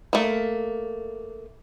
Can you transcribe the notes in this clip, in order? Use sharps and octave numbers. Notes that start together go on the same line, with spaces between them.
A3 A#3